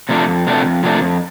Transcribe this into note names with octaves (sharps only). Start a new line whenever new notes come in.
C3 F3 A3 D4
F2
C3 F3 A3 D4
F2
C3 F3 A3 D4
F2